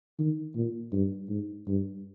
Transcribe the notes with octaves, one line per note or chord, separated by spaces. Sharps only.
D#3
A#2
G2
G#2
G2